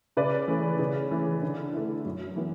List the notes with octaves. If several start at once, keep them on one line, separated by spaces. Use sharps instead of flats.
C#3 B4 D5
E3 A3 C#4
C#3
E3 A3
D3
A3 E4
F#2
E3 B3